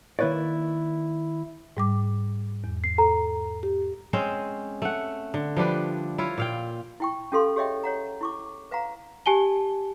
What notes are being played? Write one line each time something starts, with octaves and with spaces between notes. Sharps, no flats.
D#3 A#3 E4 B4 C#5 D5
G#2 G3 D6
E2
C7
A4 A#5
G4
G#3 C4 C#4 C5
A3 F#5
D3
F3 G3 D4 B4
E4 F4 C#5
A#2 F5 G5
E4 G5 C#6
C#4 F4 G4 A4 F5 C6
G4 G#4 C#5 D#5 E5 G5
C#5 F#5 A#5
E4 C#6 D6
B4 F5 F#5 A#5
G4 G#5 A5 G7